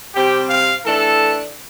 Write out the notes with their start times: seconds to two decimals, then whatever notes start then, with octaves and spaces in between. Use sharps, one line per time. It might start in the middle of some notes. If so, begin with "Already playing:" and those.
0.15 C3 G3 C4 G4
0.50 F5
0.85 E3 A3 D4 A4